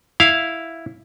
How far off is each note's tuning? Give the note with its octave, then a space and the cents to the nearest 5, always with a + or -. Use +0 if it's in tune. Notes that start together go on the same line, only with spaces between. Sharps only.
E4 +0 F5 +0